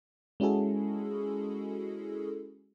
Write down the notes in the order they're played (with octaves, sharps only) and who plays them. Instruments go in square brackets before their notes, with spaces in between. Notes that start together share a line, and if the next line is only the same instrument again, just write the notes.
[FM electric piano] G#3 C#4 E4 F#4 G#4 A4